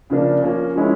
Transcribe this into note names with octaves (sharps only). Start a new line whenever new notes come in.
C#3 F3 A#3 D4
F3 A#3 C#4
F3 G#3 C#4 E4